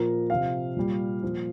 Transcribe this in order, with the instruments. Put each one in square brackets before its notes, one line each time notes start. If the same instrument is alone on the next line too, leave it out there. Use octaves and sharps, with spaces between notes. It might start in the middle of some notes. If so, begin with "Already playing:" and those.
Already playing: [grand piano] A#2 F3 A#4
C3 F3 F5
A#2 G3
A#2 F3